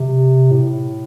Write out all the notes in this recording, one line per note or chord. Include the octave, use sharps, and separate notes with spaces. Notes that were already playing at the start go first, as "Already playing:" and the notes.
Already playing: C3
A2